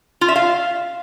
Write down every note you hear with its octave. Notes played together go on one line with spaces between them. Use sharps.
F4
E5
F5